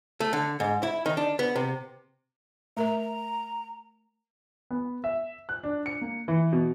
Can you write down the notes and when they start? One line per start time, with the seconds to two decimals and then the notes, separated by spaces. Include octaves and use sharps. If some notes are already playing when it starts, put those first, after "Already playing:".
0.20 A3
0.33 D3
0.60 G#2
0.83 E4
1.06 D#3
1.17 D4
1.39 B3
1.56 C3
2.77 A3 A#4 E5 A#5
4.71 B3
5.04 E5
5.49 F#6
5.63 D4
5.86 C#7
6.02 A#3
6.28 E3
6.53 B2